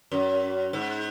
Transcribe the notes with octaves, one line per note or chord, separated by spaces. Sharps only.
F#2
G#2